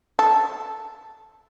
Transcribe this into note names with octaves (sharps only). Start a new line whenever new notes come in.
A4